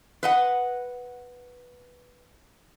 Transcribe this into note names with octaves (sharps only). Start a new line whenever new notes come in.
B4 D#5 F#5